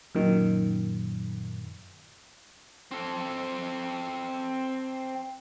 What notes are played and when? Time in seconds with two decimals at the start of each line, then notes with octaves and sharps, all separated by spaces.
0.15 F#2 A#2 D#3
2.91 C4 A4